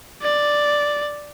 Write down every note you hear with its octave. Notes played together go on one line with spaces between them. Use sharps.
D5